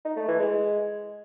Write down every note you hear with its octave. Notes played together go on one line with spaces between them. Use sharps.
D#4
A3
E3
G#3